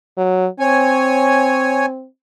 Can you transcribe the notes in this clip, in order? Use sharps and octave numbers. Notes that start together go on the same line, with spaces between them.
F#3
C4 C#5 G#5